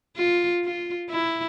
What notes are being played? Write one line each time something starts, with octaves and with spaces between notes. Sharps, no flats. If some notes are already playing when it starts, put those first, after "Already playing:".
F4
F4
E4